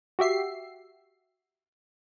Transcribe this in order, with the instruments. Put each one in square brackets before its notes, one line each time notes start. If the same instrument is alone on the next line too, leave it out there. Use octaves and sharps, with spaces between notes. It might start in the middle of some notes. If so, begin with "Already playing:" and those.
[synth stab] F#4 G4 E5 C7